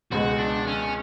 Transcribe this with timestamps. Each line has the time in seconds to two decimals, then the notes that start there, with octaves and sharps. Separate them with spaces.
0.12 C#2 B2 G#3 F#4
0.39 D4
0.67 C#4